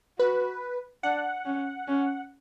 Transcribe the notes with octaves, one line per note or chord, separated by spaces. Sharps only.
F#4 B4
D4 F#5
C#4
C#4